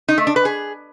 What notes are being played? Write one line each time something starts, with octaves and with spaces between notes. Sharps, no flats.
D#4
A3
D4
B4
G#4